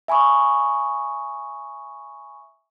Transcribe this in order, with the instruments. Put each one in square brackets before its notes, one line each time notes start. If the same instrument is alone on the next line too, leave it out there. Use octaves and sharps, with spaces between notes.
[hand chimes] E5 G#5 B5 C#6 D#6